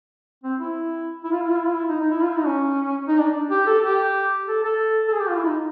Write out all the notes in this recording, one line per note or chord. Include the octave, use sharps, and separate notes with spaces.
C4
E4
E4
F4
E4
F4
E4
F4
E4
D#4
D#4
E4
F4
E4
D#4
C#4
D#4
D4
G4
A4
G4
A4
A4
A4
G#4
G4
F4
E4
D#4